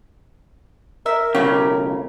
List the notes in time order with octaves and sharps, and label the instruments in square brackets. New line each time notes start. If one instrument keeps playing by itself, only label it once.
[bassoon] A#4 [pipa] E5
[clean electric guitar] B1 C#3 [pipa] G4 C#5